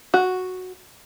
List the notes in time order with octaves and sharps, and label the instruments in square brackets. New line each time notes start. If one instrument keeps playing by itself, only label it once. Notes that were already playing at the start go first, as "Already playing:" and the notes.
[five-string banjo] F#4